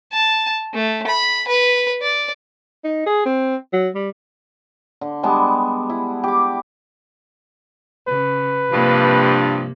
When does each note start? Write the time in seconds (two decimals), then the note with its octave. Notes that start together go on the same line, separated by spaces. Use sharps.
0.13 A5
0.74 A3
1.07 B5
1.48 B4
2.02 D5
2.84 D#4
3.06 G#4
3.26 C4
3.73 F#3
3.95 G3
5.01 D3
5.23 G3 G#3 B3 A5
5.90 E4
6.24 G4 D6
8.08 C#3 B4
8.72 G2 C3 F3 A#3